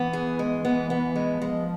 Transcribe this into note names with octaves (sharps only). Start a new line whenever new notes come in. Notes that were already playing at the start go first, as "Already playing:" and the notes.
Already playing: E3 B3
G#4
G#3
E3 B3
B3
G#3
F3 G#3